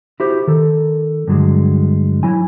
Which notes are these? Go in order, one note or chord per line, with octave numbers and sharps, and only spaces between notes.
E4 F#4 G4 C5
D#3 A4
G2 D3 F#3 G#3
F#3 E4 G#5